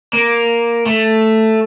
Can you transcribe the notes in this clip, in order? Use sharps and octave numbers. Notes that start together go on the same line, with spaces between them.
A#3
A3